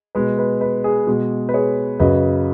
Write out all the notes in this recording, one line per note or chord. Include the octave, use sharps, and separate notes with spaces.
B2 G#3 B4
B4
B4
G#4
B2 G#3
B4
G#4 C#5
F#2 C#3 F#3 B4 D#5